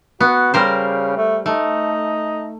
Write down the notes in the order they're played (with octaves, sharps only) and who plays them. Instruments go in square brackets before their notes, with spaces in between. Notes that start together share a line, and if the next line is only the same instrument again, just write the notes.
[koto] B3 [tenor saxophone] F#4
[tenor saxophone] C#3 [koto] G3 A#4 C5
[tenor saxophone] A3
[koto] A3 [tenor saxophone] D#4